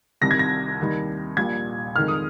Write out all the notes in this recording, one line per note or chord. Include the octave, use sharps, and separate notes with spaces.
C2 C3 D#3 G3 A#6
G#6
A#6
D#2 D#3 G3
A#1 A#2 G3 G#6
F2 D#3 G#3 F6
D#6